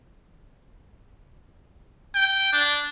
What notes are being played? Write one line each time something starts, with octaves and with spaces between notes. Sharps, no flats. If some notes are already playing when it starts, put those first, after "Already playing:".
G5
D4